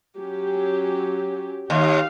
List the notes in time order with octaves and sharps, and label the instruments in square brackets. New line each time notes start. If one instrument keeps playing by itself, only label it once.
[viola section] F#3 C#4 G4
[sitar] D#2 [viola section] G4 F5